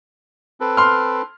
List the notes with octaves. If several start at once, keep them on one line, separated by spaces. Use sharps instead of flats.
C4 A4 B4
C6 F6